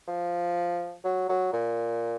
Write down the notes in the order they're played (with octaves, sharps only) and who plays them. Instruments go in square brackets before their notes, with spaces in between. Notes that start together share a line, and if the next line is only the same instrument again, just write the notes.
[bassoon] F3
F#3
F#3
A#2